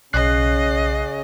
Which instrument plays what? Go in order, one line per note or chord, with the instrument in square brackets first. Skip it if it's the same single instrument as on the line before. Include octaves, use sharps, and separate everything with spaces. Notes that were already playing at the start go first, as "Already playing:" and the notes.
[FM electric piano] B1 F#6 C7 [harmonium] C#3 C#4 [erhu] D#5